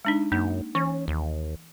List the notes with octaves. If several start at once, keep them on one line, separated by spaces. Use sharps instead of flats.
G#3 D4 D#4
F#2 A#3 D#4
E3 C#4 C#5
D#2